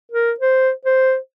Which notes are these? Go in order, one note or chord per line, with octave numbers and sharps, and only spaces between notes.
A#4
C5
C5